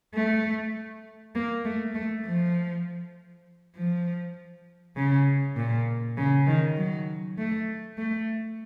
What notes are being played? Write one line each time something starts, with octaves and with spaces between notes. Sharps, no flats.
A3
A#3
A3
A3
F3
F3
C#3
A#2
C#3
D#3
F#3
A3
A3